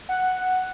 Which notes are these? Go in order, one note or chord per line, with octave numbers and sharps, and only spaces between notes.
F#5